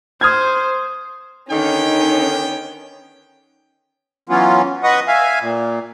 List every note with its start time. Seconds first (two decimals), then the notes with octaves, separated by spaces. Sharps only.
0.21 C5 D#6 F6 G#6
1.51 D3 D#3 B3 C#4 D#4 G5
4.29 E3 F#3 B3 C#4 F4
4.84 B4 D#5 F#5 C#6 D#6
5.08 E5 F5 G#5
5.41 A#2